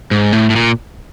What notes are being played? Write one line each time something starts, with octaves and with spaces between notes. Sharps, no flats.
G#2
A2
A2
A#2